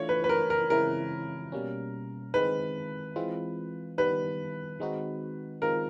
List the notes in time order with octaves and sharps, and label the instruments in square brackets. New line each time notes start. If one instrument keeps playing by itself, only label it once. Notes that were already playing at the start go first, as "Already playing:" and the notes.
Already playing: [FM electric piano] E3 A3 D4 F4 [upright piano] C#5
[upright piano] B4
B4
A#4
A#4
[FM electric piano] C#3 E3 G#3 C4 E4 [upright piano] A#4
[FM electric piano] B2 G3 A#3 C#4
[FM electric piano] D#3 G#3 C4 [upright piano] B4
[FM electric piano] E3 G#3 C4 F4
[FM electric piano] D#3 G3 B3 [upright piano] B4
[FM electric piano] D#3 G#3 C4 D#4 F#4
[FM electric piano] D#3 G#3 C4 F4 [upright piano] A#4